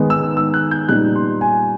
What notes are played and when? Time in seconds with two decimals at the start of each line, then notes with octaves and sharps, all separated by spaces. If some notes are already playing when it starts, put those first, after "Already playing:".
Already playing: D#3 G#3 B3 D#4
0.10 E6
0.37 E6
0.54 F#6
0.71 G6
0.89 A#2 G3 B3 D#4 F#6
1.16 C6
1.41 G#5